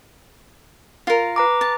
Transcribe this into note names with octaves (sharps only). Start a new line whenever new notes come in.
F4 A#4
B4 A#5 D6
A5